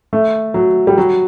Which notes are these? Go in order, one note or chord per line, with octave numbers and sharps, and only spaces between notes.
A3
F#3
G3
F#3